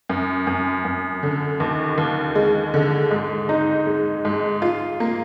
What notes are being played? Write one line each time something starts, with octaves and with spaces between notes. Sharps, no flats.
F#2
F#2
F#2
D3
D#2
D#2
G#3
D3
G#2
D#4
G#3
G#2
F4
A#3